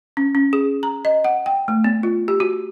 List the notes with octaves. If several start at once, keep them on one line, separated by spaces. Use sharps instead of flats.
C#4
C#4
G#4
A#5
D#5
F#5
G5
A3
B3
F4
G4
F#4